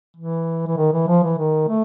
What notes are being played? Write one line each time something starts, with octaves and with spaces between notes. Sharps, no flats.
E3
E3
D#3
E3
F3
E3
D#3
A3